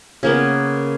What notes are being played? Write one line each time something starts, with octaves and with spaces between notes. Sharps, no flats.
C#3 A#3 B3